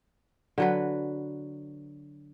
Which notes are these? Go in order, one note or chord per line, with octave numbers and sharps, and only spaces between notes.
D3 F#3 B4